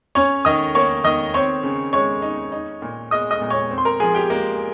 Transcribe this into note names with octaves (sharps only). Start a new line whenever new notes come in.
C#4 C#5 C#6
D#3 D#5 D#6
A#3 C#5 C#6
D#3 D#5 D#6
C4 C#5 C#6
C#3
G#3 C#5 C#6
D#4
D#4
A#2
G#3 D#5 D#6
D#5 D#6
A#2
C#5 C#6
C4
C6
A#4 A#5
F3 G#4 G#5
G4 G5
G#3 A#3 A#4